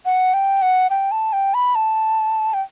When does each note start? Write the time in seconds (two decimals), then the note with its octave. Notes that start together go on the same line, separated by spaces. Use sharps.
0.05 F#5
0.34 G5
0.62 F#5
0.90 G5
1.11 A5
1.33 G5
1.54 B5
1.75 A5
2.54 G5